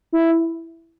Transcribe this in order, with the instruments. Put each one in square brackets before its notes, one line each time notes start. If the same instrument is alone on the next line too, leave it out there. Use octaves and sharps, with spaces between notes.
[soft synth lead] E4